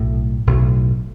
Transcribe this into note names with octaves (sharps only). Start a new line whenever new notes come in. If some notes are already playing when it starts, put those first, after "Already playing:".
Already playing: B1 A2
B1 A2